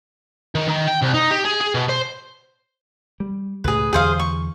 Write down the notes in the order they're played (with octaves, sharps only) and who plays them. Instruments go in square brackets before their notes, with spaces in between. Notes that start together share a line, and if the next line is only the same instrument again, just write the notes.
[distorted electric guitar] D#3
D#3
G5
C2
D#4
G4
G#4
G#4
B2
C5
[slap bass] G3
[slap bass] C#2 A2 [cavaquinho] G#4 B4
[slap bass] E2 D3 F#3 [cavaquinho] G#4 C5 F5
[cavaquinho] C#6